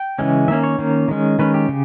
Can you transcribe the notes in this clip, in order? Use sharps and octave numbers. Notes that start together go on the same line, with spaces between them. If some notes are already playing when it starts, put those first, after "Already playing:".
Already playing: G5
C#3 E3 G#3 C#4
D#3 A#3 C#4 E5
C#5
D#3 A#3 C#4
D#3 G#3 C#4
D#3 G#3 C#4 B4
G4
C#3